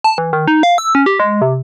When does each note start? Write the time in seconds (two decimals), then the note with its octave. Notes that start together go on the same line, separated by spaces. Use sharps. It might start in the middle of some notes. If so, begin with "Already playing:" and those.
0.04 A5
0.18 E3
0.33 D#3
0.47 D#4
0.63 F5
0.78 E6
0.95 C#4
1.06 G4
1.20 G#3
1.42 C3